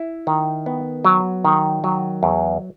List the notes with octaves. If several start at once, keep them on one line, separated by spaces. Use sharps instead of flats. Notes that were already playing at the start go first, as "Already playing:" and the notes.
Already playing: E4
D#3
B3
F#3
D#3
F#3
E2